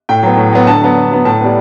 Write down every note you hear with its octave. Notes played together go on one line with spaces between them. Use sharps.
A2 G5
F#3 B3
A2
F#3 B3
D3 A5
F#3 B3
D3
F#3 B3
A2 A5
G3 B3